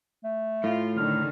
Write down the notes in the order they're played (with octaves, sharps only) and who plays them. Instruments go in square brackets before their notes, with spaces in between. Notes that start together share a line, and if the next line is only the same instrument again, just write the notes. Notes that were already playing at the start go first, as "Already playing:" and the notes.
[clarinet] A3
[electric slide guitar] A2 [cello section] F4
[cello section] D3 D#3 [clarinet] F6